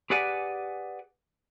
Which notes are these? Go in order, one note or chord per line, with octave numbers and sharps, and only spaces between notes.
G4 G#4 B4 D5 F#5 G#5